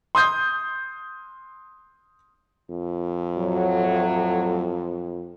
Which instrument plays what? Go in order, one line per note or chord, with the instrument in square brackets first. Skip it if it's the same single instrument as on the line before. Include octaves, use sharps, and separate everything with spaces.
[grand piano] C6 D#6 G6
[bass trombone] F2
[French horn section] A2 F#3